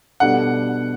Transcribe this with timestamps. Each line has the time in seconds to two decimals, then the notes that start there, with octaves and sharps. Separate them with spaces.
0.20 B2 G3 D4 A4 F#5